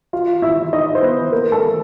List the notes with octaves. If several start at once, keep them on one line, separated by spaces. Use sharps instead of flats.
F4 F5
E4 E5
D#4 D#5
C5
B3 B4
A#3 A#4
A3 A4